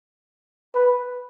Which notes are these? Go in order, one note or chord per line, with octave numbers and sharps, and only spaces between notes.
B4